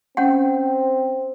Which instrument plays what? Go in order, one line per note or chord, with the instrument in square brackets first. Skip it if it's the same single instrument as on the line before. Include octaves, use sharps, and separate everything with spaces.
[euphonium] C4 [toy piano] C#4 F#5